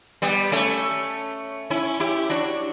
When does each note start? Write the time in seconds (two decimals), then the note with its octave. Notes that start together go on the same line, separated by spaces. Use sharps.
0.22 G3 B3
0.52 A3 C#4
1.70 C#4 E4
2.00 E4 G4
2.30 D4 F#4